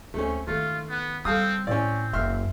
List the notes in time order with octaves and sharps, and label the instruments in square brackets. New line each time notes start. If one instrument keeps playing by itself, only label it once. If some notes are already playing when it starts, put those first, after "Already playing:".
[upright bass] D2 [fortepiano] A3 C4 C#4
[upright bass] D#3 D#4 [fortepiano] A3 [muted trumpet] F4
[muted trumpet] B3
[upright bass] G3 [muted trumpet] C4 [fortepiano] A4 F5 D#6
[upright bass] A2 [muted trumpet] C4 [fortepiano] C#4 D5
[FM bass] F#1 [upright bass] A#3 [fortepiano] E5 C6 F6